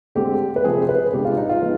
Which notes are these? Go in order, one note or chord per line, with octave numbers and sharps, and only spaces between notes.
D2 D3 G#3 C4 G4
B4
C3 F3 C4 G#4
C5
B4
C2 B2 G#3 D4 G4
F4
D#4
F4
F3 G#3 B3 D#4